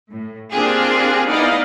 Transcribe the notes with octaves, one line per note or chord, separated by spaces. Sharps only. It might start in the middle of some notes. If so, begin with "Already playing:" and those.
A2
A#3 C4 D4 F4 G4 G#4
B3 D#4 E4 D5 D#5 F5